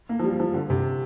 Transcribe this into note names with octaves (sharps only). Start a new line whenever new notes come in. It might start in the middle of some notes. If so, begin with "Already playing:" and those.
A#3
F3
G3
F3
D3
C3